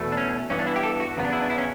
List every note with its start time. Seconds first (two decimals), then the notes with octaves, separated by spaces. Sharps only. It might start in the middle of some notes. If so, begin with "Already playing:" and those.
Already playing: E2 B2 A3
0.12 D4
0.17 C#4
0.50 G2 E3 B3 C#4
0.59 D4
0.67 E4
0.76 G4
0.83 A4
1.00 F#4
1.17 E2 C#3 F#3 B3
1.25 D4
1.33 E4
1.42 D4
1.50 E4
1.58 C#4